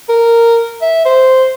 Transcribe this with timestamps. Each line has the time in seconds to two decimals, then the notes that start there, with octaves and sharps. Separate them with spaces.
0.09 A#4
0.82 E5
1.05 C5